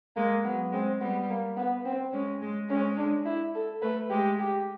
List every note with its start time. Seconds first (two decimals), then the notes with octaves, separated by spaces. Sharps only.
0.16 G#3 A#3
0.44 F#3 B3
0.72 G#3 C4
1.01 G3 B3
1.29 A#3
1.57 B3
1.85 C4
2.13 G#3 C#4
2.42 G#3
2.69 G#3 C#4
2.97 D4
3.26 E4
3.54 A4
3.82 A3 B4
4.10 G#3 G4
4.39 G4